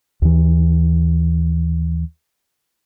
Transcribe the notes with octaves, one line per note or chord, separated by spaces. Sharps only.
D#2 E3